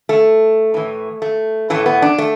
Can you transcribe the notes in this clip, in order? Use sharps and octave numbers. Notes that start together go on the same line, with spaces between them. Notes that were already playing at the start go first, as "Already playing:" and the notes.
A3
A2 E3
A3
A2 E3 A3
B3
D4
A3